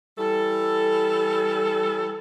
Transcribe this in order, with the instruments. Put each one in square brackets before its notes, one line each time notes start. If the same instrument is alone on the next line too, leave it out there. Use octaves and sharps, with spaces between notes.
[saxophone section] E3 G3 A4